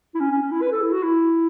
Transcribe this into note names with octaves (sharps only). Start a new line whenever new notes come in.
E4
C#4
C#4
C#4
E4
B4
A4
E4
F#4
E4